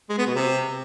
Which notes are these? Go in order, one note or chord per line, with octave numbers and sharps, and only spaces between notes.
G#3
B3
B2
C3